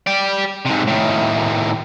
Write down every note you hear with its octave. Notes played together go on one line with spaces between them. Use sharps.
G4 D5
G#2 C3
A2 D#3